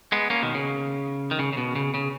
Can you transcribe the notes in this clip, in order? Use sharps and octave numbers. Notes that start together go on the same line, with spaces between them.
G#3 B3
A#3 C#4
B2 D#3
C#3
D#3
C#3
C#3
B2
C#3
C#3